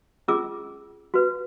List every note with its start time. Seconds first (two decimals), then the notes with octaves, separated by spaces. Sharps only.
0.28 C#4 F4 G#4 D6 E6
1.14 F#4 B4